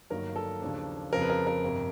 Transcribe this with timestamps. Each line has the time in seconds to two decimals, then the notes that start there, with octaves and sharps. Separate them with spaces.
0.10 G1 G2 D#3 F#3 A#3 A#4
0.36 A4
0.61 D#2 C#3 F3 A#3 D4
1.13 F2 C#3 F3 A#4
1.22 B4
1.30 A#4
1.47 A#4
1.63 G1 F2 C3